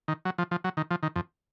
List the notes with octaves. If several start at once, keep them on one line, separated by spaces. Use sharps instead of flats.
D#3
F#3
F3
F3
F#3
D#3
F3
D#3
F2